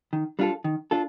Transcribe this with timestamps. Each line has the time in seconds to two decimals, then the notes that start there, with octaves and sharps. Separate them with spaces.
0.13 D#3
0.39 G3 D4 F4 A4
0.64 D#3
0.91 D4 F4 A4